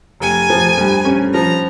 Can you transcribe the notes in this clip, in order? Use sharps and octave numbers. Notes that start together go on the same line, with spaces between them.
F1 G#5
F3
G2
C#4
F3 A#5